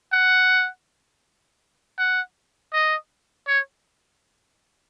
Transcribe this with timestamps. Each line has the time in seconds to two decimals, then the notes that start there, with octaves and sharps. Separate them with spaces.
0.13 F#5
1.98 F#5
2.73 D#5
3.48 C#5